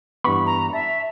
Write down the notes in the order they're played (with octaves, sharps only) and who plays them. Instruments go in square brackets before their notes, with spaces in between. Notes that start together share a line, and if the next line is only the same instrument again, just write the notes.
[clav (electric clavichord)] G2 E3 B3 [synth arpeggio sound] B5 C#6
[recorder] A#5
[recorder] E5 [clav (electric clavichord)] A5